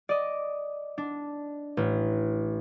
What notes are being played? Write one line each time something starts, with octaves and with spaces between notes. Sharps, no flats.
D5 D#5
D4
A1